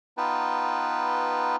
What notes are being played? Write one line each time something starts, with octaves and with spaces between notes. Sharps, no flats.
B3 D#4 F4 B4 G5 A5